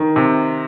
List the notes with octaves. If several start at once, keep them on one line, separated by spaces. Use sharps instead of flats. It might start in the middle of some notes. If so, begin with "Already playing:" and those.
Already playing: D#3
C3